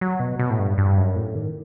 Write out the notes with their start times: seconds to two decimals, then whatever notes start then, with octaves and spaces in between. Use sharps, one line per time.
0.01 F#3
0.20 B2
0.39 B2
0.50 A2
0.59 G2
0.78 G2
0.97 F#2
1.16 A2
1.35 D#3